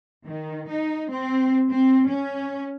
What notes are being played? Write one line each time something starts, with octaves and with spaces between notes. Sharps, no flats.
D#3
D#4
C4
C4
C#4